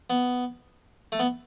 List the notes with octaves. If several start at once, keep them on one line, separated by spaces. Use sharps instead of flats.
B3
A3
B3